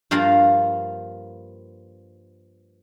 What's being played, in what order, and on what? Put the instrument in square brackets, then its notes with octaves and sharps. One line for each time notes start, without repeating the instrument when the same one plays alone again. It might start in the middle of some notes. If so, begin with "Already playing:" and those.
[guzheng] G2 F3 A#3 F5 A#5